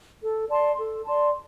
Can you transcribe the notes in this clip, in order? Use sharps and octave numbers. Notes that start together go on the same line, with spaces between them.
A4
D5 A5 C6
A4
D5 A5 C6